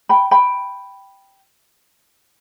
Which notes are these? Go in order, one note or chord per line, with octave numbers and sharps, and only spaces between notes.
G5 B5
G5 B5